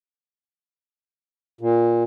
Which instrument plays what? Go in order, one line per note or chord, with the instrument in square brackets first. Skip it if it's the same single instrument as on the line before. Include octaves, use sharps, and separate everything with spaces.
[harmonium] A#2